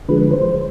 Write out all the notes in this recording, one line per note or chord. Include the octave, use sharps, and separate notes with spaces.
D3 F3 G#3 B4
C5